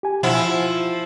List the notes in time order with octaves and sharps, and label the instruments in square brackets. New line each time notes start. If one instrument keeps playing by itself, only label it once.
[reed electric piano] G4 G#5
[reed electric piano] B2 F#5 [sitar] F3 E4
[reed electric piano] F4